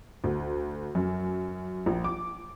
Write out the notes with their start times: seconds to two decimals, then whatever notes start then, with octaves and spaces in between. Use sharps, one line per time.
0.24 D2
0.95 F#2
1.86 A#1
2.04 D6